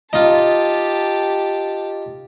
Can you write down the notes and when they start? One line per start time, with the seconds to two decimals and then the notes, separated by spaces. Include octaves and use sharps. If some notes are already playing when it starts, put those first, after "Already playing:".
0.13 D#4 F4 G4 A5